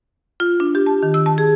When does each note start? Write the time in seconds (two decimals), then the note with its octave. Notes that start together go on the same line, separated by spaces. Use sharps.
0.40 F4
0.60 D4
0.75 G4
0.86 A5
1.03 D#3
1.14 E6
1.26 A5
1.38 G#4